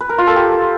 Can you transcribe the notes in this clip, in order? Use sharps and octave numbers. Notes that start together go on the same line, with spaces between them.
B4
A#4
F4
A4
G4